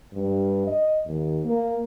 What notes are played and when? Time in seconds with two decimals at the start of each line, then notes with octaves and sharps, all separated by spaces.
0.13 G2
0.67 D#5
1.06 D#2
1.45 A#3